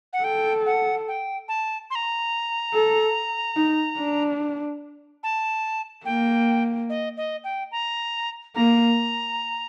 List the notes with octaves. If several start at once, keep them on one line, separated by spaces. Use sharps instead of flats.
F#5
A4 G5
F#5
G5
A5
C6
A#5
A4
D#4
D4
A5
A#3 G5
D#5
D#5
G5
A#5
A#3 A#5